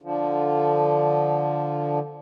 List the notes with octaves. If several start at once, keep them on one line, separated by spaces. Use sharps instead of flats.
D3 F3